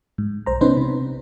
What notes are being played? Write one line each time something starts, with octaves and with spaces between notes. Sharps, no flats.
G#2
B1 C5 A#5
C3 B3 C#4 D#4 B4 C5
C3